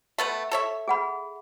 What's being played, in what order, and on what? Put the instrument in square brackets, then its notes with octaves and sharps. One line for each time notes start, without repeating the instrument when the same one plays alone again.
[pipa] A3 B3 B4
A4 C#5 E5
[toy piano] G#4 F#5 B5